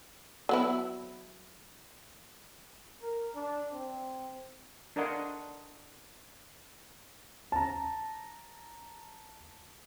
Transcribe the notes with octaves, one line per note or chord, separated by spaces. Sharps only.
F#3 B3 E4
A#4
D4
C4
D4 A#4 D5 D#5 F#5 C6
A5 A#5